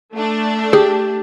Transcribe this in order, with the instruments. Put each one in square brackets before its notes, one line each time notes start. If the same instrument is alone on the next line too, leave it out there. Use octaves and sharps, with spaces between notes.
[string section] A3 D4
[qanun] G4 [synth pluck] G#4